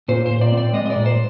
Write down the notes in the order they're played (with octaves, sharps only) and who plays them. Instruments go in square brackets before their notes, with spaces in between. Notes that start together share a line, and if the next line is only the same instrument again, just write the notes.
[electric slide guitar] A#2 C5
A#2 C5
D5
C4
D5
G#3 D#5
D#5
D5
A#2
C5